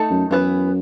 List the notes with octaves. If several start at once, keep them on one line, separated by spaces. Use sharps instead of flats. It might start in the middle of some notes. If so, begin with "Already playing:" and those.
Already playing: A3 D#4 A4
F#2
F#2 E3 B3 E4 B4